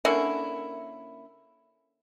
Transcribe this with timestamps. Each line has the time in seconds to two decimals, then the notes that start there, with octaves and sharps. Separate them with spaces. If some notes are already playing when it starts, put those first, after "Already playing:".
0.05 D3 A#3 C#4 E4